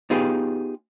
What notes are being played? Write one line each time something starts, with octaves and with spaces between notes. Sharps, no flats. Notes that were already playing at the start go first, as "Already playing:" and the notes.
B3 D#4 F4 G4 G#4